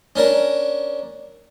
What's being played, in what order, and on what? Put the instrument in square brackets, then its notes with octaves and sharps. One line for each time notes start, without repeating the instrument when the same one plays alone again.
[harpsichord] C#4 D4 A#4